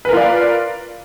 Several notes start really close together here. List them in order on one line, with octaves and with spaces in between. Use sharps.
B4 A#4 F4 D5 F5